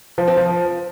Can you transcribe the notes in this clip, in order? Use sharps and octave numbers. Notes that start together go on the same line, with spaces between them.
F3
C4
F3